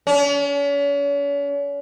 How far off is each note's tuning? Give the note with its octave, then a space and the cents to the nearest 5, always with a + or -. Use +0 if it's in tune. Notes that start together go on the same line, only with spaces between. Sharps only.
C#4 +40